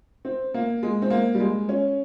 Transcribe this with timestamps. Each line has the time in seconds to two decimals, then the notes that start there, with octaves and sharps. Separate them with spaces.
0.25 C4
0.54 A#3
0.83 G#3
1.02 C4
1.10 A#3
1.35 G3
1.40 G#3
1.69 C#4